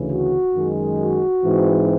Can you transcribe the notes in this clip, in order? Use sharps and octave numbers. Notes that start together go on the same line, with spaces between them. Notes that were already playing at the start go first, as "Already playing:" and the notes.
Already playing: D2 C#3 E3
F#4
F#2 D#3 G#3
F#4
G#2 E3 G#3 C4